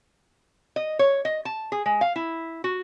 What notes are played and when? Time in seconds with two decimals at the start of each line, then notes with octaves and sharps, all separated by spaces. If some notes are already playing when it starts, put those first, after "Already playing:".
0.76 D#5
0.99 C#5
1.25 D#5
1.45 A5
1.72 G#4
1.86 G#3
2.01 F5
2.16 E4
2.64 F#4